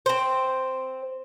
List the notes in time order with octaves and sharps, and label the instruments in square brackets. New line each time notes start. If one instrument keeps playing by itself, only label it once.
[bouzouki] C4 C5